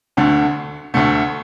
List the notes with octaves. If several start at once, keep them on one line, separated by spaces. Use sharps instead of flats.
D2 D3 A3
D2 D3 A3